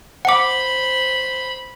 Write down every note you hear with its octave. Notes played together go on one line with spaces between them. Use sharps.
C5 F#5 B5 D6